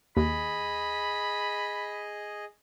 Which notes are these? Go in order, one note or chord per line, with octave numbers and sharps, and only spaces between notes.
D#2 G#4 D#5 B5